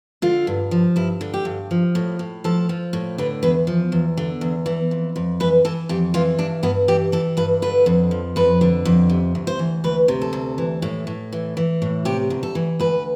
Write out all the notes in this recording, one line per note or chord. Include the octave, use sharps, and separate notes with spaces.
D3 F4
G2
F3
G2 E4
D3
G4
G2
F3
A2
A2
F3 A4
F3
A2
D3 B4
E2 B4
F3
E2
D3
E2
E3
F2
F2
E3 B4
E3 A4
F2 G4
E3 F4
G2 D4
G2 B3
E3 G4
E3 A4
G2 B4
D3 B4
F2
F3
F2 B4
D3
F2
C3
D2
C5
E3
D2 B4
C3
A4
D2
E3
A2
A2
E3
E3
A2
C3 G4
D2
A4
E3
D2 B4